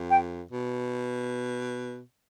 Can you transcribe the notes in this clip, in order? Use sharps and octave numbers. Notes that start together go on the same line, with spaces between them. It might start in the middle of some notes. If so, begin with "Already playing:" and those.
Already playing: F2
G5
B2